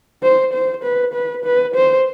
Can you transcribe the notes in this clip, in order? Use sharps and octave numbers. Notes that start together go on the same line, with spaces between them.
C5
C5
B4
B4
B4
C5